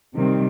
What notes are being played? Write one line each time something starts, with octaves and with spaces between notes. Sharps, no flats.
C3 D#3 G3 C4